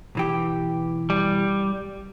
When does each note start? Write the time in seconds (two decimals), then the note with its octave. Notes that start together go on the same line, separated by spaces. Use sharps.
0.15 B1 E3 G4
1.10 G3